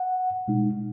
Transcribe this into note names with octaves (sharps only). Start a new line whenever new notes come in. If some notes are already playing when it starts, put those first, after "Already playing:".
Already playing: F#5
B2 G#3 D#4